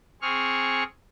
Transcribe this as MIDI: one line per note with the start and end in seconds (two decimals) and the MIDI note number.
0.22 0.83 60
0.22 0.83 68
0.22 0.83 85
0.22 0.83 89